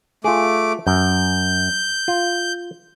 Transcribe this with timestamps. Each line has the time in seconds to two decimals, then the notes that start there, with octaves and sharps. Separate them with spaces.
0.24 A3 F4 G#4 D6
0.87 F#2 G6
2.08 F4